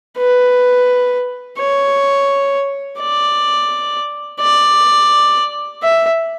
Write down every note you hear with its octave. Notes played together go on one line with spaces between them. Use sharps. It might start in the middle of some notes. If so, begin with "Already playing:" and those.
B4
C#5
D5
D5
E5